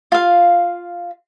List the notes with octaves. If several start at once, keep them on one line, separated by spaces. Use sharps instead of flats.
F4 F5